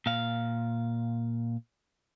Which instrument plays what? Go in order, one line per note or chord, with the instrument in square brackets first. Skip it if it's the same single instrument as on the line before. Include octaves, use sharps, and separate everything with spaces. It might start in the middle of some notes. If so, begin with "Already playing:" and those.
[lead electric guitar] A#2 F5